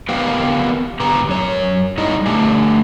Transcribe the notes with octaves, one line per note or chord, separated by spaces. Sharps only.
B3 G4 A#4 B4 F5 G5
G#2 B3 G4 B4 A#5
F#2 C#5
G3 D#4 E4 G#4 D#5
D3 A3 G4 G#4